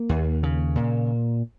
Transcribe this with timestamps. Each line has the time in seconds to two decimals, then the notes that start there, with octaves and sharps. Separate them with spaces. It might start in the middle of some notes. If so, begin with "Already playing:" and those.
Already playing: A#3
0.09 D#2
0.43 C#3
0.76 A#2